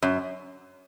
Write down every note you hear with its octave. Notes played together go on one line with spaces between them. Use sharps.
F#2